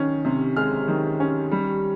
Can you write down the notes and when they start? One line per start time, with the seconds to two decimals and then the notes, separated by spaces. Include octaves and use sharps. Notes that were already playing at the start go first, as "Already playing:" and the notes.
Already playing: D#3 C#4
0.25 C3
0.56 G#3 F6
0.88 D#3
1.20 C#4
1.51 G3